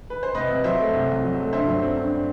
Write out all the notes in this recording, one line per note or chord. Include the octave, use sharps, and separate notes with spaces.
B4
C5
C2 B4 D#5
C3
F#3 C5 E5
A3
C2
C3
F#3
A3
G2 C5 E5
F#3
C4
G2